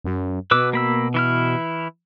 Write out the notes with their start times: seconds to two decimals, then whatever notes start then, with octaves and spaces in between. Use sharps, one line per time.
0.04 F#2
0.51 B2 B4 D6 E6
0.73 A#3 B5 E6
1.14 E3 E4 F6